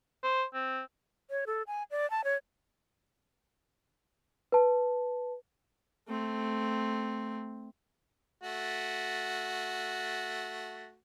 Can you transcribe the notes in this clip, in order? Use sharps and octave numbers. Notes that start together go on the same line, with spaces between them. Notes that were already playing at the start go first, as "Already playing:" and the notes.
C5
C4
C#5
A4
G#5
D5
A5
C#5
B4 A5
A3 C4
A3 F#4